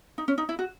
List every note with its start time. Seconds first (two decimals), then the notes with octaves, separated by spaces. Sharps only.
0.18 D#4
0.28 C#4
0.38 D#4
0.49 E4
0.59 F#4